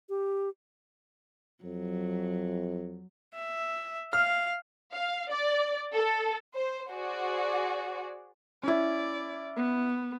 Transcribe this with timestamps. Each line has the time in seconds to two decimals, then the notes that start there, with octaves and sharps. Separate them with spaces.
0.09 G4
1.64 F2 F#3
3.34 E5
4.13 F5 F6
4.93 F5
5.31 D5
5.94 A4
6.54 C5
6.90 F#4 G#4 C5 D5
8.63 C#4 E4 D5
9.56 B3